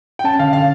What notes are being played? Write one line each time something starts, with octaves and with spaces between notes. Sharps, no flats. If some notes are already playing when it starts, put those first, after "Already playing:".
G5
C#4 A5
D3 F5
D3 F5